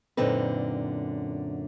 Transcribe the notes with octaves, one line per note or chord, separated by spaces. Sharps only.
F#2 A#2 D3 C4 D#4 B4